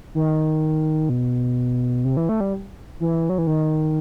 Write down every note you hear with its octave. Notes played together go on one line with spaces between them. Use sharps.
D#3
B2
C3
E3
A3
G3
E3
F#3
E3
D#3